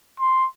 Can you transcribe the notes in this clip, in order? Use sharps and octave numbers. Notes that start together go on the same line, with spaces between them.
C6